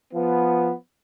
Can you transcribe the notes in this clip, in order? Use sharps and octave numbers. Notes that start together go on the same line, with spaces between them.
F3 B3